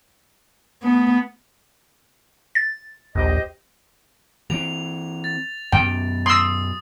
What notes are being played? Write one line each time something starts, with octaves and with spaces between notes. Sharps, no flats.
A3 B3 D#6
A6
A#1 D#2 G4 C5 D#5
E3 C4 F7
A6
F#2 B2 G5
C6 D#6 E6